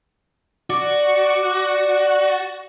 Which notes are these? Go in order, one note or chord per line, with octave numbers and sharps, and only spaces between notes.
F#4 D5